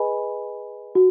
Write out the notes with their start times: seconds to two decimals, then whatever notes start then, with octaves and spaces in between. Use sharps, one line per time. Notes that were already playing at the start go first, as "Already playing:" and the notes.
Already playing: G#4 B4 D#5 G#5 B5
0.95 F#4